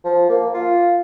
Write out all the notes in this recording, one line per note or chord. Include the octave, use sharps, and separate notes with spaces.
F3
A#3
F4